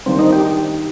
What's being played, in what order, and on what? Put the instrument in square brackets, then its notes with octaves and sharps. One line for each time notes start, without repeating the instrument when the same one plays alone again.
[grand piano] D#3 G3 A#3 D4 [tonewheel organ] C4
[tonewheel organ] D#4
G4